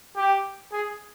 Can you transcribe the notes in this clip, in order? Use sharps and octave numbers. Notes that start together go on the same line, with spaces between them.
G4
G#4